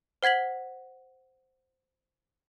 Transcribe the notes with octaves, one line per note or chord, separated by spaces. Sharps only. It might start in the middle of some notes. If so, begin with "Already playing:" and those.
C5 F#5 G#6 B6 F#7